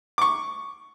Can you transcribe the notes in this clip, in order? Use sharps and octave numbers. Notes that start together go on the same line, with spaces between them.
C#6 D6